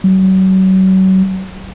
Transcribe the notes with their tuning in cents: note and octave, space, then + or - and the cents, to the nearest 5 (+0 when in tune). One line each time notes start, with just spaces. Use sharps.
F#3 +35